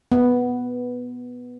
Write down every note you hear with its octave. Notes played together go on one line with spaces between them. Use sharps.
B3